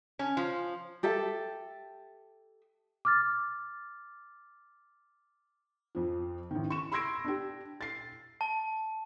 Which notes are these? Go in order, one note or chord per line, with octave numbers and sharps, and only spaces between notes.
C#4
F3
G4 A4 E5
D6 F6 A6
F2 F3
A1 D#3
C#6 E7
B5 C6 E6 G#6 A#6 D7
D4 G4
A6 C7
A5